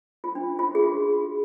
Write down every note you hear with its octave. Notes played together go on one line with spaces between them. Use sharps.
F4
D4
F4
G#4
F#4